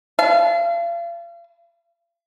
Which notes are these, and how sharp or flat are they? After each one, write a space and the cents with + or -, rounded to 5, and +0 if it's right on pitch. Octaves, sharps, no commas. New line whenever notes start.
F5 -40 A5 -25